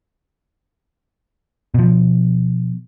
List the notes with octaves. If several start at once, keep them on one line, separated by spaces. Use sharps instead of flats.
B2 F3